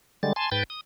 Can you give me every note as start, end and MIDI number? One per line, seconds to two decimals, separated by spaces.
0.23 0.33 50
0.23 0.33 55
0.23 0.33 56
0.23 0.33 93
0.36 0.50 80
0.36 0.50 81
0.36 0.50 84
0.52 0.63 44
0.52 0.63 71
0.52 0.63 79
0.52 0.63 91
0.52 0.63 93
0.70 0.81 87